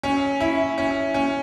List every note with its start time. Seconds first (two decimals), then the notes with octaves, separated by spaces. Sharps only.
0.03 C#4
0.41 E4
0.78 C#4
1.14 C#4